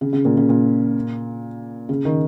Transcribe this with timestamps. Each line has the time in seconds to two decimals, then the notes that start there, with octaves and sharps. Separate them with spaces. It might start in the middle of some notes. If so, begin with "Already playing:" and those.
0.01 C#3
0.13 C#3
0.25 A#2
0.37 C#3
0.49 A#2
1.89 C#3
2.05 D#3